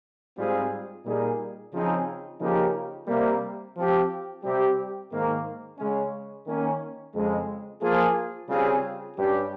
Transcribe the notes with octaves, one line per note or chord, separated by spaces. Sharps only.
G#2 G3 C4 F4 G#4
A#2 G3 A#3 D#4 G#4
C#3 F3 C4 D#4 G#4
C#3 F3 A#3 D#4 G4
C3 G3 A#3
F3 C4 G4
C3 G3 C4 G4
G#2 D#3 A#3
C#3 G#3 C#4
D#3 A#3 C#4
F2 C#3 G#3
F3 A#3 F4 G#4
C#3 G3 C4 F4 G#4
G2 G3 C#4 G4